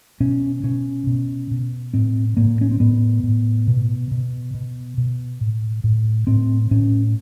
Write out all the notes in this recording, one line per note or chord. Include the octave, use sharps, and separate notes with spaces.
B2 C#4
B2 C#4
B2
B2
A2 C4
A2 A#3
C#4
C4
A2 B3
A2
B2
B2
B2
B2
A2
A2
A2 C4
A2 C#4